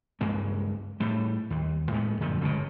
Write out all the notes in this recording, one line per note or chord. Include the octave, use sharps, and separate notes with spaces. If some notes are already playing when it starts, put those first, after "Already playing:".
C#2 G2 G#3 A#3
A2 G3
D#2
A2 G#3 B3
F#2 A#2 D3 F3
G1 C#2 B2